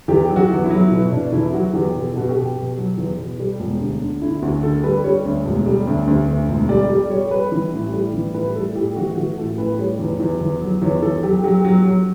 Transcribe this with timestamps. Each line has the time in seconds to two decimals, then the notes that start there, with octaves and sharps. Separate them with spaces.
0.08 E2 G4
0.29 F#3
0.36 F#4
0.50 E2
0.64 E4
0.71 F#3
0.91 B2 E4
1.12 B2 D4
1.32 E2 E4
1.53 F#3 F#4
1.73 E2 G4
1.95 B2
2.02 A4
2.15 B2 F#4
2.29 G4
2.35 B2
2.57 B2
2.77 F#3
2.98 E2
3.18 B2
3.39 G3
3.60 E1
3.80 D2
4.01 D3
4.22 D3 E4
4.42 D2 F#4
4.63 D3 A4
4.84 G3 B4
5.04 G3 C#5
5.25 D2
5.45 E1
5.66 G3
5.87 D2
6.07 D2
6.28 D2
6.48 E1
6.69 G3 D5
6.90 G3 D5
7.10 G3 C#5
7.26 C#5
7.31 G3 B4
7.52 E3
7.73 A1
7.93 G3
8.14 E3
8.34 A2 B4
8.55 G3 A4
8.76 A2 G4
8.96 E3 F#4
9.17 E3 F#4
9.38 A1 A4
9.58 A1 B4
9.79 G3 C#5
9.99 E2
10.20 E2
10.41 E2
10.61 F#3
10.82 E2 C#5
11.03 E2 A4
11.23 F#3 G4
11.44 F#3 G4
11.65 F#3
11.85 F#3